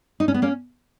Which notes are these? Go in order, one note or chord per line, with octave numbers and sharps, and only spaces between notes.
D#4
C#4
B3
A#3 C#4